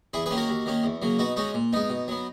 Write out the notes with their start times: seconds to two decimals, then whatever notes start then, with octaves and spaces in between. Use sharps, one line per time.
0.13 E2 E4 G#4
0.26 G#4 B4
0.31 D#3 A#3 C#4
0.37 F#4 A#4
0.49 D#2
0.66 D#3 A#3 C#4
0.84 E2
1.02 C#3 F#3 A#3
1.19 B2 D#4 F#4
1.36 G#3 C#4 D#4 F#4
1.54 A#2
1.73 G#3 B3 D#4
1.90 B2
2.08 F#3 B3